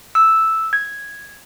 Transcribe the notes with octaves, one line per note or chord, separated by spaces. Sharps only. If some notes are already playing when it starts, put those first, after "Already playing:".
E6
G#6